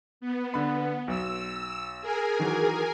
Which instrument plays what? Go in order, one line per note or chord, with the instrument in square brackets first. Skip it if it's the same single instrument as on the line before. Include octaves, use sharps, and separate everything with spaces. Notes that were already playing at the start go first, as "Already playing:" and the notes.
[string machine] B3
[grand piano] D3 B5
[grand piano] B1 [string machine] E6
[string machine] G#4 A#4 G#5
[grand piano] D#3 E3 F#3